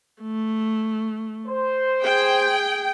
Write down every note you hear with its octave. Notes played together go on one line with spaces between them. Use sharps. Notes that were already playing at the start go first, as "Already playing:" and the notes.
A3
C5
G#4 G5